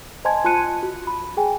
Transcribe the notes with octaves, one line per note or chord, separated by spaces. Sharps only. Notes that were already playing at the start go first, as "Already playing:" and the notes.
C5 D#5 G#5 A5 C6 G#6
F4 A5 C6 F#6 C#7 D#7
F#4
B5
G#4 G5 G#5